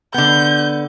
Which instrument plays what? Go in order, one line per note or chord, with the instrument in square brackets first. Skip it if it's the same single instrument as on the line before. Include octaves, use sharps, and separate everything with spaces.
[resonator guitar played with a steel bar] D3 B3 [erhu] G6